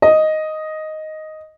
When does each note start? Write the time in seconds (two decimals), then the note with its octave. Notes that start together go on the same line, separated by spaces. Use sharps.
0.02 D#5